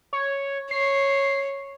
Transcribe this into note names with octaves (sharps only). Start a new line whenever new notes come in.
C#5
C#5 C7